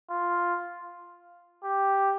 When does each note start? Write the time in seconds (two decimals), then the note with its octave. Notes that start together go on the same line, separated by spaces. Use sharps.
0.10 F4
1.64 G4